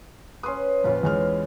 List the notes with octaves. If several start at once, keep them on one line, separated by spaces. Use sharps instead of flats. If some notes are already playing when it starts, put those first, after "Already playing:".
C#4 B4 C6 D#6
F2 A#2 F3 C#4 F4 B4
E2 G#3 F6